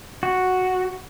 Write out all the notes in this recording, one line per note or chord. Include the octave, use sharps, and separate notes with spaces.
F#4